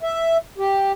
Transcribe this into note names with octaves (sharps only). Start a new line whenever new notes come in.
E5
G4